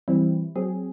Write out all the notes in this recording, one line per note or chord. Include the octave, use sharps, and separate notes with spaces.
E3 G3 C4 E4
F#3 C4 G#4